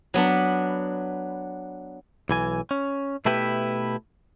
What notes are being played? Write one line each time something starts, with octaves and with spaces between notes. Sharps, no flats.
F#3 B3 D4 B5
B1 E3 G#5
C#4
B2 A3 E4 G4 B4